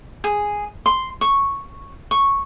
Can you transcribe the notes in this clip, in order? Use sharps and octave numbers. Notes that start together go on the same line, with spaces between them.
G#4
C6
C#6
C#6